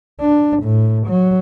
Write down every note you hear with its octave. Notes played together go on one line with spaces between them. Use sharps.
D4
A2
F#3